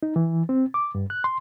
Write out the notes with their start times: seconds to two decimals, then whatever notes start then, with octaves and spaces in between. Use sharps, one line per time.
0.03 D#4
0.16 E3
0.49 C4
0.74 D6
0.95 G2
1.10 F#6
1.24 C6